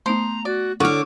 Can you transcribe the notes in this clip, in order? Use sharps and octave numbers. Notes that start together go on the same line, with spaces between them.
A3 B3 D#4 C5 A#5
F#4 D5
D3 D#4 E4 F#4 C#5 D6 F6